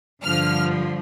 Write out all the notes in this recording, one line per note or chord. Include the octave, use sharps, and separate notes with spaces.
G2 D3 F3 F6